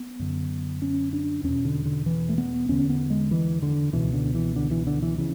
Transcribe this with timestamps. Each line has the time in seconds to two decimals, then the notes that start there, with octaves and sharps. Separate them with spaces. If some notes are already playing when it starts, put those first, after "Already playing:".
Already playing: B3
0.19 F#2 D3
0.82 C#4
1.13 D4
1.44 E2 B2 C#4
1.65 D3
1.85 D3
2.06 E3
2.29 A3
2.38 B3
2.69 E2 D3 C#4
2.90 B3
3.10 G#3
3.31 E3
3.62 D3
3.93 C#2 B2 E3
4.14 D3
4.35 E3
4.56 D3
4.71 E3
4.87 D3
5.02 E3
5.18 C#3 E3